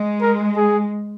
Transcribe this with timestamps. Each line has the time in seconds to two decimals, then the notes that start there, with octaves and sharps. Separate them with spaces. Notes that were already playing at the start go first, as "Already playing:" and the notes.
Already playing: G#3
0.21 A#4
0.56 G#4